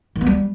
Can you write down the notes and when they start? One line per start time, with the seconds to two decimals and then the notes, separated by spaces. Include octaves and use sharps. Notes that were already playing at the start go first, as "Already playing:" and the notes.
0.16 D#3
0.21 B3
0.26 G3